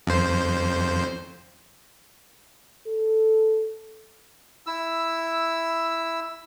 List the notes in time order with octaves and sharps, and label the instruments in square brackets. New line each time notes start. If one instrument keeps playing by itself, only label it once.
[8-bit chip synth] F2 C5
[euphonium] A4
[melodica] E4 E6